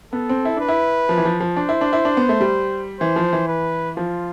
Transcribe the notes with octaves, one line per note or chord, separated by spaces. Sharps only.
B3 A4
C4
E4
D4 B4
E4
F3
E3
F3
F3
D4 C5
E4
D4
E4
D4
B3
A3
G3
E3 C5
F3
E3
B4
F3 F4